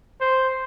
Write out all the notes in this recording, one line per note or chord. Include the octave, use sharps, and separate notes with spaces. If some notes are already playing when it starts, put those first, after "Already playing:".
C5